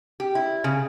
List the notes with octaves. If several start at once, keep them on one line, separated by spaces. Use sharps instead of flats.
G4
E4
C#3